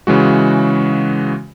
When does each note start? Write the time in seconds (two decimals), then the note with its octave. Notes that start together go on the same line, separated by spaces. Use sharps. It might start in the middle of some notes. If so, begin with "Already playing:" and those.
0.07 C#3 E3 G#3 F#4